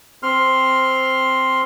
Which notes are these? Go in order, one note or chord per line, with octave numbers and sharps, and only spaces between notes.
C4 C6 F6